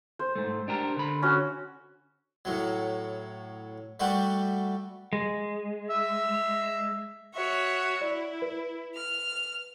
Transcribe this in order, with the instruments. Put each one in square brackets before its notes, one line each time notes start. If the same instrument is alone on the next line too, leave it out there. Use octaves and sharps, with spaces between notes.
[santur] C5
[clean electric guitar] G#2 A3
D4 G4 A#4
D3 B5
[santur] C#4 F#4
[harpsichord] A2 F#3
G3 A3 F#4 G4
[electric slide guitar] G#3
[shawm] E5
[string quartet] F#4 C#5 E5
[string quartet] E4 [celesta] D5
[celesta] B4
[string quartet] F6